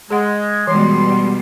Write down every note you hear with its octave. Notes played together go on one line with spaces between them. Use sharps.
G#3 G#4 F#5
B2 E3 G3 G#3 C6